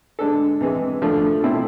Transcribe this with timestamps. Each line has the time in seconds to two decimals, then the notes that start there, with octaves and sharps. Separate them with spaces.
0.19 D3 G#3 D4 A4
0.61 C3 E3 G#3
1.02 D3 F3 A3 D4
1.42 B2 A3 C4 E4